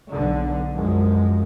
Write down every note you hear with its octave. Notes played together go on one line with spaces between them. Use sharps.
B1 D3
F#2 F3 G#3